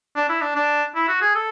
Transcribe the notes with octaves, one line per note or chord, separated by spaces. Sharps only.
D4
E4
D4
D4
E4
F#4
G#4
A4